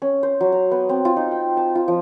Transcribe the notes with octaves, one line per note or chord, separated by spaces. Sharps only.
C#4
C5
F#3
A#5
B3
C4
F4
D#4
G5
A5
F4
F3